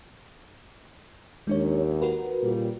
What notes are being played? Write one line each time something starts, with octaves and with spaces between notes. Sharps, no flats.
D#2 G#3 D4 C#5
F#4 A#4 B4
A#2 C#3 G3